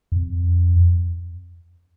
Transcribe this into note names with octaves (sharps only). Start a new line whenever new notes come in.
F2